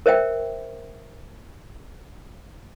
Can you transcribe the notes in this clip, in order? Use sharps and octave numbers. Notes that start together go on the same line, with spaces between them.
A#4 C5 E5 G5